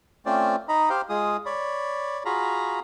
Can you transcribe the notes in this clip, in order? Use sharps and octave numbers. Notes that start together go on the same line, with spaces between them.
A3 C4 C#4 F4 C5 D5
D#4 D#5 A#5 B5
G4 C5 F5 G5
G#3 F4 G#4 D#6
C#5 D5 B5
F4 F#4 G#4 F5 A#5 B5